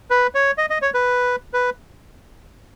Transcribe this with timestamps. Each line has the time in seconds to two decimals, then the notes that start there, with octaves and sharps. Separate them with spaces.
0.10 B4
0.35 C#5
0.58 D#5
0.70 D#5
0.82 C#5
0.94 B4
1.53 B4